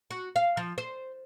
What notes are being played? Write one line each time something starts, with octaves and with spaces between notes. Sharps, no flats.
F#4
F5
F3
C5